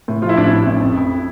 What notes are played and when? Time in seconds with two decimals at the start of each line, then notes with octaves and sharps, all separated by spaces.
0.08 A2
0.22 F3 F4
0.29 E4
0.37 A1 D4
0.44 E4
0.52 A1
0.67 A1
0.81 F2
0.95 F2